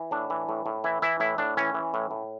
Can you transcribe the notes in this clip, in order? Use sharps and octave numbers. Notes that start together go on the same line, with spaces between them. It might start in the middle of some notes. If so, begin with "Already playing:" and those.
Already playing: E3
A2 D4
E3
A2
A2
E3 E4
E3 E4
A2 E4
A2 D4
E3 C#4
E3
A2
A2